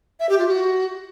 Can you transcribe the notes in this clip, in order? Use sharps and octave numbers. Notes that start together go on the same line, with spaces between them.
E5
G4
F4
F#4